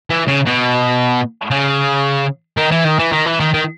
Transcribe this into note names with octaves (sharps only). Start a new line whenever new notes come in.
E3
C#3
B2
C#3
D#3
E3
D#3
E3
D#3
E3
D#3
D#3